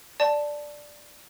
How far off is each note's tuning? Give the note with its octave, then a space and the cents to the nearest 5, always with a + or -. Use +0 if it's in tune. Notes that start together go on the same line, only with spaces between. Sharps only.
D5 +0 A5 +0